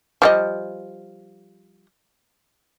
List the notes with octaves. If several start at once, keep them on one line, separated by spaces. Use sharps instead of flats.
F3 G3 D#5